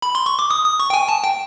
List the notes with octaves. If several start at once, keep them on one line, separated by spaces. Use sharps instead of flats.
B5
C6
C#6
D6
D#6
D#6
C#6
G5
G#5
A5
G5